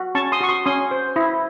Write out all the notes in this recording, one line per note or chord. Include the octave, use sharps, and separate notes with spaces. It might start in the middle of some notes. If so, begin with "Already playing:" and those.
Already playing: F#4
C#4 A5 C#6
C6 D#6
F#4 C#6
C6 D#6
C#4 C6 D#6
C5
E4